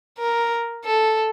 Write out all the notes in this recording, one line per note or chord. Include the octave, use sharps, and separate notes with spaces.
A#4
A4